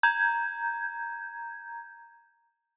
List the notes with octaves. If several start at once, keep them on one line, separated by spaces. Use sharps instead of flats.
A#5 G6 G#6